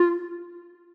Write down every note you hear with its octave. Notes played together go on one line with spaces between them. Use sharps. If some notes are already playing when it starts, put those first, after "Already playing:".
Already playing: F4